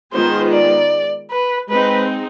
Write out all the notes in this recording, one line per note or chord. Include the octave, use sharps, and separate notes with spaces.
D#3 G#3 B3 F4 G#4 C5
D5
B4
G#3 C4 D#4 B4